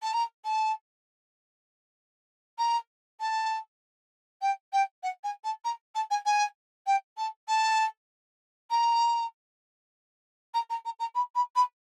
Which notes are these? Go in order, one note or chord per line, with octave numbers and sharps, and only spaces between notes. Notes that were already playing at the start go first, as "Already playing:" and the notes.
A5
A#5
A5
A#5
A5
G5
G5
F#5
G#5
A5
A#5
A5
G#5
G#5
G5
A5
A5
A#5
A#5
A#5
A#5
A#5
B5
B5
B5